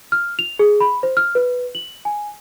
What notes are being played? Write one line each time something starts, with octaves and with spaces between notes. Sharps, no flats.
F6
F7
G#4
B5
C5
F6
B4
F#7
G#5